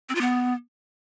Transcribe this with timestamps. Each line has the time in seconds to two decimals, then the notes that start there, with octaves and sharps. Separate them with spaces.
0.09 C4
0.15 F4
0.21 B3